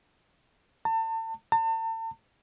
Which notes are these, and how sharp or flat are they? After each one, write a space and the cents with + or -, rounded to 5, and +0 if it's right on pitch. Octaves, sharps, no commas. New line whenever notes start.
A5 +35
A5 +40